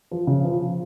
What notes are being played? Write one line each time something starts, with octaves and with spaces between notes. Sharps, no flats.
F3
C#3
F3